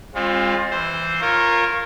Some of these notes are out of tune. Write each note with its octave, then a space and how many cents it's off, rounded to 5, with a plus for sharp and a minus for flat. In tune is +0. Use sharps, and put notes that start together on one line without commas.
G#3 -35 C4 +30 F4 +15
E3 +0 C5 +0
F4 +0 A#4 +0 C#5 -25